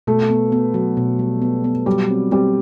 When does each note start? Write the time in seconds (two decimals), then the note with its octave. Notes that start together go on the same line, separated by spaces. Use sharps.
0.07 B2 A3
0.30 B3
0.52 B3
0.74 F#3
0.97 B2
1.19 G3
1.42 B3
1.64 B3
1.86 F#3 G3
2.09 C4
2.31 G3 C4